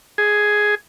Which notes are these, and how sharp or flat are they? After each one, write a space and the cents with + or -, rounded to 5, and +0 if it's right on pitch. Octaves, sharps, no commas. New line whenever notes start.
G#4 +5